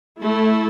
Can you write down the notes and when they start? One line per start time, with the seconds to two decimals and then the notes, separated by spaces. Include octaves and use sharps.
0.21 A3 E4 A4